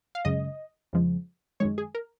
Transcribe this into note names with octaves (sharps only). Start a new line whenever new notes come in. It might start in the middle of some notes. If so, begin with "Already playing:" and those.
F5
F#2 C#3 G#3 D#5
F2 C#3 F3 G#3
F#2 D#3 G#3 C#5
G#4
A#4